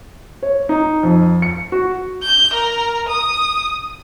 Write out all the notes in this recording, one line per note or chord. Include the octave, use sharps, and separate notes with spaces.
C#5
D#4
F2
C#7
F#4
G6
A#4
D#6